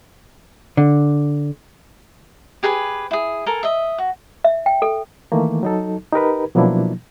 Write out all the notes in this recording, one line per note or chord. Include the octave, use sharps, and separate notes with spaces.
D3
G4 G#4 B4 G#5
E4 G#4
A4 A#4 G#5
D#5 E5
F#4
E5
G5
A4
D#3 E3 A3 A#3
F#3 D#4 A4
D#4 G4 A#4 B4
B2 F3 F#3 A#3 D4 E4